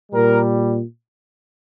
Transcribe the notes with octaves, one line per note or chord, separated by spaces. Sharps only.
A#2 G3 A#4